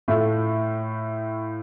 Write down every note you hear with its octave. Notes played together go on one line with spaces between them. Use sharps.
A2 A3 F4 A4